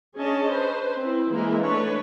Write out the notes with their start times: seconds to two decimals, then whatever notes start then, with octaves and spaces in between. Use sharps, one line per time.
0.19 C#4 D4 G#4 C#5 D#5 A5
0.50 B4 C5
0.99 C4 E4
1.32 E3 G#3 A#3 A#4
1.62 A3 D4 B4 C#5